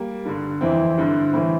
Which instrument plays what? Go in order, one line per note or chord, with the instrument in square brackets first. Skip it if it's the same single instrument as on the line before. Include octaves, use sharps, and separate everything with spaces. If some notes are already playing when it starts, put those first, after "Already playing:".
Already playing: [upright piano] G3 A#3
G2 D3
F2 E3 C4 E4
G2 D3
A2 E3 C4 E4